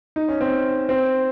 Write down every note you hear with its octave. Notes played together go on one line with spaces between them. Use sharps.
D#4
C#4
C4
C4